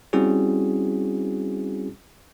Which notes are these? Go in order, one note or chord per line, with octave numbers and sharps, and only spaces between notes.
G3 C4 C#4 E4 F#4 G#4